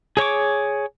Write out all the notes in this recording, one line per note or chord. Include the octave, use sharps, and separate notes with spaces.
G#4 C#5 C#6 D6